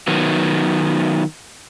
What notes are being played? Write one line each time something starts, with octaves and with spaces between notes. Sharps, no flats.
D#3 F#3 B3